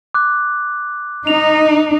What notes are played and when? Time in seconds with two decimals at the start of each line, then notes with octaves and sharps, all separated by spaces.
0.14 D6 F#6
1.27 D#4 F7